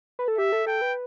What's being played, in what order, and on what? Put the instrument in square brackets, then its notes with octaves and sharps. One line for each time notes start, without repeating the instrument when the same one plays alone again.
[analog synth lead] B4
A4
[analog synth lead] G4 [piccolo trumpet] E5
[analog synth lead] A4
[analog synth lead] A4 [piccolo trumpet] G5
[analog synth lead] B4